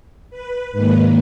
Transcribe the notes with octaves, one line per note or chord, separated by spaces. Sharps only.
B4
G#2 D#3 A#3 B4